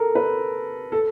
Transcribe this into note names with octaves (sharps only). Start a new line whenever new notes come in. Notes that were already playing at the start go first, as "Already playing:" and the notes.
Already playing: A4 A#4
B4
A4